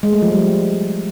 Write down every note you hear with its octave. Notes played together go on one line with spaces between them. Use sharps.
G#3
A3
F3
G3